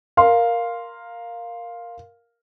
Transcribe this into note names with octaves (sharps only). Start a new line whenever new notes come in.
A#4 F5 C6